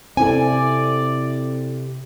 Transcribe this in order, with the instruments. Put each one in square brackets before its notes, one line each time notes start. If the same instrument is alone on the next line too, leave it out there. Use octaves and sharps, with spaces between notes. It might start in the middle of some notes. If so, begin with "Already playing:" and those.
[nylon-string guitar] C3 G#5 [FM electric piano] C4 E4 A4 [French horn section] D5